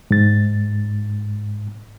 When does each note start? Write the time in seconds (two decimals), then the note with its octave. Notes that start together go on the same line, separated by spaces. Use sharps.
0.11 G#2 A6